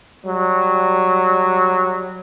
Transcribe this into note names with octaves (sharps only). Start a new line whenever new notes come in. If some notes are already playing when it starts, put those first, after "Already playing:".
F#3 G3